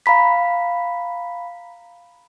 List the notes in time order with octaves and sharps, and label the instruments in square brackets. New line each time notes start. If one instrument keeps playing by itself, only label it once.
[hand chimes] F5 A#5 B5 B6